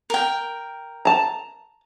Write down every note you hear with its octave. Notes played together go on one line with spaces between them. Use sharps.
A#4 G5
A5 A#5